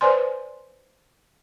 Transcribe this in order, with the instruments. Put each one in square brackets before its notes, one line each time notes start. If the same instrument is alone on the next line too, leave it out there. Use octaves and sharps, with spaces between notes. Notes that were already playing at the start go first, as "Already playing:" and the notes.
[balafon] B4 C5 D5 G#5 C6